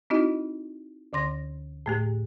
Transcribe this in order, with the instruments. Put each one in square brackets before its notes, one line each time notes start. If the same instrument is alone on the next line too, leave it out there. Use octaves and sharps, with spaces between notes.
[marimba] C4 D#4 E4 F#4 D#5
D2 D3 C6 A#6
A2 A3 G4